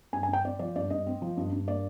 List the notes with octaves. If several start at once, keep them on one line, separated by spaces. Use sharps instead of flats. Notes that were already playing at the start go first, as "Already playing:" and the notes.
G2 G#5
G#5
G2
G5
C4 D5
F3 D5
G2 D5
G2 D#5
C4
F3
G2
G2
A#3 D5